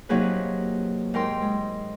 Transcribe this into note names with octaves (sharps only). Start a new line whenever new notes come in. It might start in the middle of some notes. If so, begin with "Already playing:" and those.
C3 F#3 A#3 D#4 G#4 B4
G#2 A#4 G5 C6
G#3